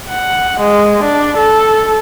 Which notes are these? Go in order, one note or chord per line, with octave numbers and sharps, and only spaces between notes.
F#5
G#3
D4
A4